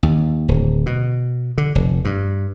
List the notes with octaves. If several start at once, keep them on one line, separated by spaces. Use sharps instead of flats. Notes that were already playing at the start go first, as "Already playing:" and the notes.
D#2
D1
B2
D3
F1
G2